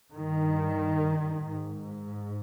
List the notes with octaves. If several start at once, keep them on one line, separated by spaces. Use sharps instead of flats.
G2 D#3
G#2